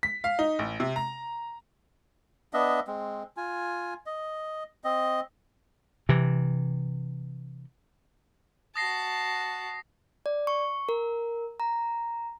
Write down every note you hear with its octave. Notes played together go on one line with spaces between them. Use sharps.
B6
F5
D#4
A1
C3
A#5
B3 D4 D#5 E5
G#3 C4
F4 G#5
D#5
C4 D#5
C3 E3
F#4 A5 D#6 A#6 C7
D5
C#6
A#4
A#5